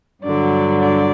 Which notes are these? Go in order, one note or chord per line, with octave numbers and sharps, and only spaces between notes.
G2 D3 F#3 D5
D5